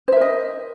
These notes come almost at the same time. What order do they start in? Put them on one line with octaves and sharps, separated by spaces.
C5 E5 A#4 D#5